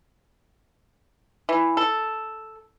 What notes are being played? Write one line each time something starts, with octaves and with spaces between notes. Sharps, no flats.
E3
A4